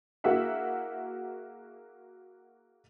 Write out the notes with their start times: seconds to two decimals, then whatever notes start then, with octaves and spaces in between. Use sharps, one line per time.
0.24 A#3 E4 F#4 G#4 E5 F#5